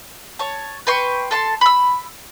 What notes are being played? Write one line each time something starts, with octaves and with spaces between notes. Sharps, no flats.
C#5 A5
B4 G5 C6 C#6
A4 A5 C6
B5 E6